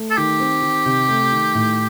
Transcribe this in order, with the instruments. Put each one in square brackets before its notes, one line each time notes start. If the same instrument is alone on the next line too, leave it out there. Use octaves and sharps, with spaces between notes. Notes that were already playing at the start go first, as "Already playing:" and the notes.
Already playing: [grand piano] A3
[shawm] A4
[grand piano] D#3 [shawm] G4
[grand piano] C4
D#3
C3
A3
D#3
A2